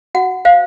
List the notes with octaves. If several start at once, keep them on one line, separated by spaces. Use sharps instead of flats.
F#4 F#5
C5 F5